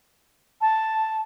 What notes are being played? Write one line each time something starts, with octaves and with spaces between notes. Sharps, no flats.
A5